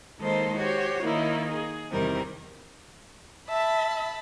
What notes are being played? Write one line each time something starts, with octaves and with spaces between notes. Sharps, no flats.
D#3 G#3 A#3 D#4 A4 C5
F#4 G4 C5 C#5
D#3 A#3 D#4 E4
G#4
E2 C3 D#3 G3 C4 A#4
E5 A5 B5